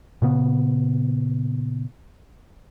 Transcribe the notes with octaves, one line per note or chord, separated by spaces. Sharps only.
A#2 C#3 B3